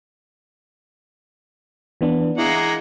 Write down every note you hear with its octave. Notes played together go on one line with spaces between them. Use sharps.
E3 B3 D4
G#3 A#3 E4 F#5